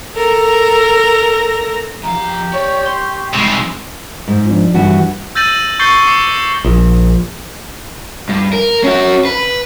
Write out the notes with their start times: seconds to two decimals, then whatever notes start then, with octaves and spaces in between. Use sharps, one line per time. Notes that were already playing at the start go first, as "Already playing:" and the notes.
0.14 A4 A#4 A#6
2.03 F2 G4 F5 A#5
2.53 C#5 D5 C#6
2.86 C6
3.34 G#2 C3 G3 G#3
4.28 G#2
4.45 F3 D4
4.74 G2 E3 F#4
5.35 E6 G6 A6 A#6 D#7 F#7
5.79 C#6 G6 A6 C7 C#7 G7
6.05 D6 C7 C#7
6.65 A#1
8.29 G2
8.53 A#4
8.84 C#4 F#4
9.25 B4